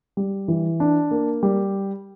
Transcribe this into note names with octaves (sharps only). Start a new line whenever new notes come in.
G3
E3
D4
A#3
G3